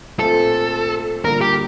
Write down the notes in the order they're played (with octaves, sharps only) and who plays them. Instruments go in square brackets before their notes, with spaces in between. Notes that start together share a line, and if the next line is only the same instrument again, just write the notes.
[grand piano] A#2 A3 C4 F4 [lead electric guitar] A4
[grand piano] D3 G3 A#3 F4 [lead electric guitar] A#4
[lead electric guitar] G4